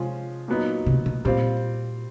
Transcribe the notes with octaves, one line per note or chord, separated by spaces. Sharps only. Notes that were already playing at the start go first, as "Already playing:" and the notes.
Already playing: C3 F3 G#3 C#4 F4
A#2 F#3 B3 D#4
C3
B2
A#2 G3 C4 F4